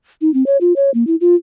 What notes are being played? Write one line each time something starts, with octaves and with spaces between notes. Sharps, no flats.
D#4
C4
C#5
F4
C#5
A#3
E4
F4